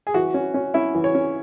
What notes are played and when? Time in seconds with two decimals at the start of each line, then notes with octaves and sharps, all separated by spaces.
0.07 G#4
0.14 E3 F#4
0.34 C#4
0.54 C#4
0.74 C#4 E4
0.95 E3
1.04 C#5
1.15 C#4